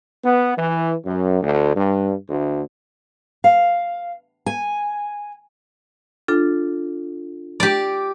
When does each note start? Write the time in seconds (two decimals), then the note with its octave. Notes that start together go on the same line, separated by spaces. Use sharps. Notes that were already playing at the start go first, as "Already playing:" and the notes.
0.23 B3
0.56 E3
1.05 F#2
1.43 D2
1.75 G2
2.29 D2
3.44 F5
4.46 G#5
6.28 D4 F4 A4
7.60 G4 D5